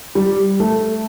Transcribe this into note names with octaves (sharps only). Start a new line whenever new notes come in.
G3
A3